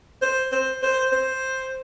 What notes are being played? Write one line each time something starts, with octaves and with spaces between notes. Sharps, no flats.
C5
C5
C5
C5